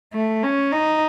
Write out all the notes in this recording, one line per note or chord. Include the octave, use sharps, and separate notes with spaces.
A3
C#4
D#4